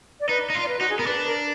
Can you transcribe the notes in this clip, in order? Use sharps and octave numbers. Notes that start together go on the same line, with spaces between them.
D5
D#4 B4
D#4
F4
D5
B4
D#4 F#4
G#4
B3 A#4
D4 B4
B4
A#4